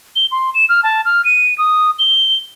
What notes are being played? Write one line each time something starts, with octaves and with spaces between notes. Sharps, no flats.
G7
C6
E7
F6
A5
F6
D#7
D#6
G7